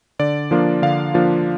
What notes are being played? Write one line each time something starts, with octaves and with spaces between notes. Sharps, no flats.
D3 D5
F3 A#3 D4 F4
D3 F5
F3 A#3 D4 F4